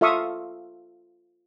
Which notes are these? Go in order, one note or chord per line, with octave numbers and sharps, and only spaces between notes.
F4 A4 E5 F5 C#6 D#6